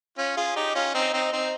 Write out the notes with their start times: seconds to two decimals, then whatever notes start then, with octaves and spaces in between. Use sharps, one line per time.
0.18 C#4 F4
0.37 F4 G#4
0.56 D#4 G4
0.75 C#4 F4
0.94 C4 D#4
1.13 C4 D#4
1.33 C4 D#4